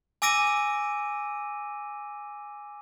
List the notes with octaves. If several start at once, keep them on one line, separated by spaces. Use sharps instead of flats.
G#5 D6 E6 A#6 D7 D#7